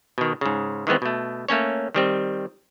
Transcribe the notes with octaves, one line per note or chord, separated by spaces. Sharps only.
B2 D#3
G#2 C#3
D#3 E3 G#3 B3 C4
B2 A3
A3 A#3 C#4 C#5
D#3 G3 C4